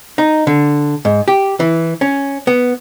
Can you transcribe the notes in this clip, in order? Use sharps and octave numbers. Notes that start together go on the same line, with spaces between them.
D#4
D3
G#2
G4
E3
C#4
B3